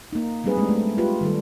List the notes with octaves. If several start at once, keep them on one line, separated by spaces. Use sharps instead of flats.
A#3 D#4
F#3 G3 C4 D#4 G#4 B4
G#3 A3 C4 D4
A3
F4 G4 B4
D#3 G3 A4